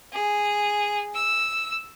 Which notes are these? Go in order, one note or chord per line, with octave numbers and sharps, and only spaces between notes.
G#4
E6